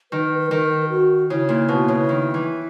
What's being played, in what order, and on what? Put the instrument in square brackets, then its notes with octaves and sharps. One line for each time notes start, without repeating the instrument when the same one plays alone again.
[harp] D#3 [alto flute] B4
[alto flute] B4
[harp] D#3 [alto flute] A#4
[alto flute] F#4
[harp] C#3 [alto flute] E4
[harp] A#2
B2
C#3
D#3
E3